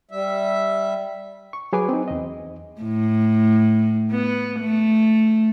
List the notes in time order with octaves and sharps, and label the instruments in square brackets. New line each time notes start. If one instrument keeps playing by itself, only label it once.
[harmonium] G3 E5
[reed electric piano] C#6
F#3 G#4 B4 G#5 D6
C4 D#4
E2 D#5
[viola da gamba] A2
B3
A3